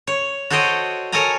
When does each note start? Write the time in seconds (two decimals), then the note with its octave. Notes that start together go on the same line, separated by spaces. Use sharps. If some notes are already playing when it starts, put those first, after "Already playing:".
0.07 C#5
0.50 F#4 A4 C5 C#5 D#5 G5
1.12 A4 A#4 C#5 G#5 A#5